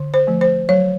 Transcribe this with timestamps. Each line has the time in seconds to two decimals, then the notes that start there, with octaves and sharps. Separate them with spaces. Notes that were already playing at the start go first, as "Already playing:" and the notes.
Already playing: D3
0.14 C5
0.27 F3 A3
0.41 C5
0.69 F#3 C#5